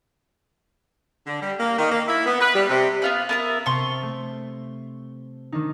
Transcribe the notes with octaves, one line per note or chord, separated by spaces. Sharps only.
D3
G3
A#3
D#3
A#3
E4
B3
B4
G3
C3
B3 F4 B4
B3 A#4 E5
C3 A5 C6 C#6
A3
D#3 D4 D#4